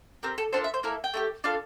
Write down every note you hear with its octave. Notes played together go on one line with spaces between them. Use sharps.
C4 G4 A#4
A4
A#3 D4 F4 A4 C5
E5
C5
A#3 E4 A4 A#4
G5
A3 E4 G4
D4 F4 A4 F5